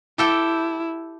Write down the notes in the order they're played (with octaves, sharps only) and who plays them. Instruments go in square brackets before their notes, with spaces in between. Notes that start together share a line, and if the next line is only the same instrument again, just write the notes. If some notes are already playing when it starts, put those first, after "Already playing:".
[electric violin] E4 [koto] G4 A4 G5